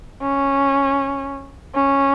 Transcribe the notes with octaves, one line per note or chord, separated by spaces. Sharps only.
C#4
C#4